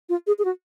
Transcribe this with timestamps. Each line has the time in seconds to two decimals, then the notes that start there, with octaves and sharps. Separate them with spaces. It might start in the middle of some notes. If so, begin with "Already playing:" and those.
0.09 F4
0.27 G#4
0.39 G#4
0.45 F#4